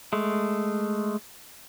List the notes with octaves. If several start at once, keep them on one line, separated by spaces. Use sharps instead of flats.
G#3 A3